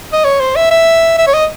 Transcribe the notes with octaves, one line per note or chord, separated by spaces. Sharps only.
D#5
C#5
C5
E5
E5
E5
C#5
D#5